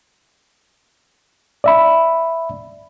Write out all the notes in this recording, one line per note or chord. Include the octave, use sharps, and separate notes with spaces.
D5 E5 B5